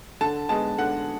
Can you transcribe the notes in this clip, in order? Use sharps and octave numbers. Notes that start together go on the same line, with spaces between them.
D3 A5
G#3 B3 A5
D3 F#5